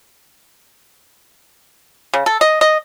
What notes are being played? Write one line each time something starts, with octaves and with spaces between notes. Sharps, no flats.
C#3
A4
D#5
D#5